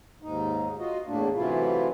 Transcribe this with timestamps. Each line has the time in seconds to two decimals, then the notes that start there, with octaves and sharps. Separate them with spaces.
0.22 D#2 G#2 D#4
0.79 F4 F#4 D#5
1.07 E2 A2 A3 A#3 D4
1.35 C3 E3 F#3 A3 E4 F4